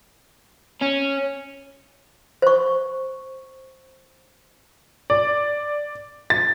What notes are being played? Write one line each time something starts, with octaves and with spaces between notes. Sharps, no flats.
C#4
C5 C#6
D5
A6